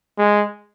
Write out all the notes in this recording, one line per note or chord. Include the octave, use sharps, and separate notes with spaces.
G#3